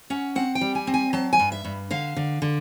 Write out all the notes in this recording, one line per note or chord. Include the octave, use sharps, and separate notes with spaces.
C#4 F#5
C4 F#5
G5
G3
G#5
C4
G#5
F#3 A5
G#5
G2
E5
G2
D3 F5
D3
D3